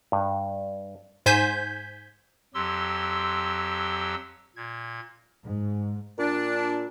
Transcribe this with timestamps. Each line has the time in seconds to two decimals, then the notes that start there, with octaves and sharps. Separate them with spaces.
0.12 G2
1.26 G#2 C5 G#5 G6 G#6 B6
2.54 F2 F#3 G4 C6 E6
4.56 A#2 G#6
5.45 G#2
6.18 A#2 D4